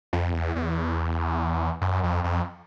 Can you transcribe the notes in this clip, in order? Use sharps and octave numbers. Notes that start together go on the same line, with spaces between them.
F2
E2
E2
F#2
F2
F2